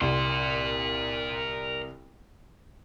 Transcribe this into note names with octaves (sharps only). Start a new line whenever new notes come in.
C2 A#4 C6